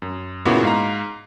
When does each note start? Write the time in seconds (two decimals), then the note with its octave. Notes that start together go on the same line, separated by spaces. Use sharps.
0.02 F#2
0.45 A#2 C#3 A#3 B3 E4 F#4
0.63 G#2 F5 A#5